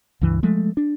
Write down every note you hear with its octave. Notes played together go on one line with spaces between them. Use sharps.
C#2 G2 E3
F3 G#3 A3
D4